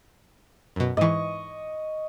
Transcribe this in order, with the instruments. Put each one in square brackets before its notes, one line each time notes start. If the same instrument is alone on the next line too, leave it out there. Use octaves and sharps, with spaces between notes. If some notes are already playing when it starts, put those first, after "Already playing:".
[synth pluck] F#2 B2
[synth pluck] G#2 E3 [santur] D#5 C#6